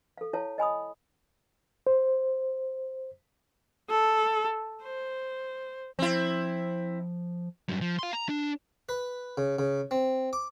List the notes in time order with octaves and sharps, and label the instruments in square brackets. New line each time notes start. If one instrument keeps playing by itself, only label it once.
[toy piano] A4 F5
E4 C#5 F5 A5
D#5 G#5 B5 D#6
[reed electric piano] C5
[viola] A4
C5
[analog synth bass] F3 [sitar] C4 E4
[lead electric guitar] G2 F#3
F3
F5 C6
A#5
D4
[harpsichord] B4
C#3
C#3
C4
D6